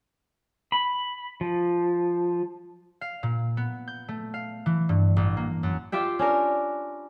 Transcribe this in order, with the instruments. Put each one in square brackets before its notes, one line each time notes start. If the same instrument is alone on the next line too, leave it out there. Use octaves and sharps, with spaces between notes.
[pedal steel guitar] B5
F3
[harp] F5
A#2
B3
G6
A3
F5
E3
G2
A1
A#3
F#2
[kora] F4 G4 E5 G5
C#4 D4 A#4